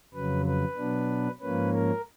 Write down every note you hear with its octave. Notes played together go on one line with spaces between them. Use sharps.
F2 C#3 F#3 B4
B4
B2 F#3 B3 D4
G#2 F3 A#3 C#4 B4
A#4